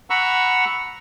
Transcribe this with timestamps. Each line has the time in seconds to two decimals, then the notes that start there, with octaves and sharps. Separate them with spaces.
0.10 F#5 A#5 B5 C#6 E6